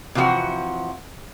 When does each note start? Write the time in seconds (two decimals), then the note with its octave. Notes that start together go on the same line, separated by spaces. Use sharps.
0.15 C3 E3 F3 F#4 F#5